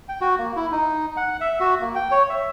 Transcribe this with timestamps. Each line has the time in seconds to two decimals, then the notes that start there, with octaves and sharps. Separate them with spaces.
0.09 G5
0.21 F#4
0.38 A#3
0.56 E4
0.72 D#4
1.17 F#5
1.41 E5
1.60 F#4
1.81 A#3
1.95 G5
2.11 C#5
2.29 E5